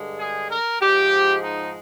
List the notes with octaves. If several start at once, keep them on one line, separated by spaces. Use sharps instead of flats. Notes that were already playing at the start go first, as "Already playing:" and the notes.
Already playing: G2 D3 G#3
G#4
A#4
G#2 F3 G#3 G4
D#4